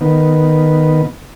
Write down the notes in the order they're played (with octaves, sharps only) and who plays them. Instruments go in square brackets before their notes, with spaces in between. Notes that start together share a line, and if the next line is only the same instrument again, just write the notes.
[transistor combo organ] D#3 B3